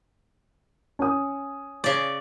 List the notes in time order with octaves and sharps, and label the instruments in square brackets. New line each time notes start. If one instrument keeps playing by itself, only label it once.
[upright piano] C#4 D#6
[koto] C#3 D5